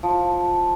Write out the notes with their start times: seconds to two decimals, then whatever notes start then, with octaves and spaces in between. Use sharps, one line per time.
0.03 F3